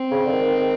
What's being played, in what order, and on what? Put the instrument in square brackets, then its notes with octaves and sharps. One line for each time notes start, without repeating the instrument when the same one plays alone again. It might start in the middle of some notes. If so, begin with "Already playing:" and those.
Already playing: [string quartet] C4
[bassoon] C#3
D3
D#3